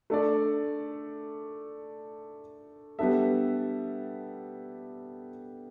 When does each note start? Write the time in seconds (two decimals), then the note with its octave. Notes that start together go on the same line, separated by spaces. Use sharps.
0.10 A3 D4 A4 D5
2.99 G3 B3 D4 A4 E5